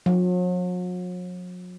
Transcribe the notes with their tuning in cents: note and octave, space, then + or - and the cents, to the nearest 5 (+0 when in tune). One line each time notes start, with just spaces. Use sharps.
F#3 -45